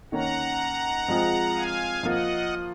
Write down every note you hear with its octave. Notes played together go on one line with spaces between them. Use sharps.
D#3 A#3 C#4 F#5 A#5
F3 G#3 C4 F4 G#4
F5 G#5
F3 A#3 F4 D#5 F#5